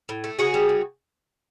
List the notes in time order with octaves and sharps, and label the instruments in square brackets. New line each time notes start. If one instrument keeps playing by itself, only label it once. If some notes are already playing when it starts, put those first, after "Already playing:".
[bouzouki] A2
A3
C#3 F#4 G#4
G3
C#3